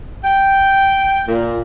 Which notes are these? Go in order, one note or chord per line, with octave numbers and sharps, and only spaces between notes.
G5
A#2